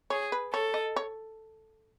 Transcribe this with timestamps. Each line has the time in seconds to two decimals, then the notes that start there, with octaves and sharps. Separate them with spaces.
0.10 G#4 C#5
0.32 B4
0.53 A4 C#5
0.74 D#5
0.96 C#5